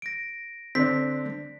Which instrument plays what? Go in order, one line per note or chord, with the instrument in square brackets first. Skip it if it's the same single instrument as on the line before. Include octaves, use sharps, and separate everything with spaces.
[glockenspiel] A#6 D7
[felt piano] D3 D4 [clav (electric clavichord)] C4 [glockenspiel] B6